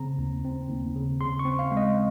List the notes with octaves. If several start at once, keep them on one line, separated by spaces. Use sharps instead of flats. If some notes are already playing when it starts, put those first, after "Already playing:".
Already playing: C#3 C4 A#5
D#2
C4
D#2
C#3
C#3 C6
C#6
C4
F5
G#3
D#5